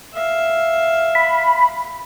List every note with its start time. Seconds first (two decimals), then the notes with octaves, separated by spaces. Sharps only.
0.13 E5 F5
1.15 B5